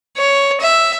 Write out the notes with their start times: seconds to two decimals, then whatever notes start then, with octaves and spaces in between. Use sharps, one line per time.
0.17 C#5
0.61 E5